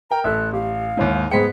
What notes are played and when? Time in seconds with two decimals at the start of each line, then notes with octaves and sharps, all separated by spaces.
0.11 A#4 G5 A#5
0.24 A1 A4 E5 F#6
0.53 G4 F5
0.97 D#2 G#2 E4 C#5
1.31 G#2 B3 G#4 C5 G5 B6 C#7